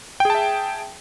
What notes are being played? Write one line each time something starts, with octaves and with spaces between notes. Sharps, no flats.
G#4 E5 G5 A5